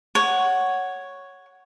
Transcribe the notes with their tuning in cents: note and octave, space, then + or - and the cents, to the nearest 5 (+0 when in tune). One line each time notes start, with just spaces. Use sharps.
C#5 +0 F#5 +0